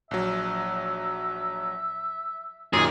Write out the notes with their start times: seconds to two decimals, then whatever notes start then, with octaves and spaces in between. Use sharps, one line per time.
0.11 A#1 F#3 E5
2.73 F#2 A#2 D#3 G#4